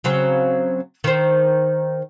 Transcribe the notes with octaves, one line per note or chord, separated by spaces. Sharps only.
C#3 F#3 C4
D#3 C5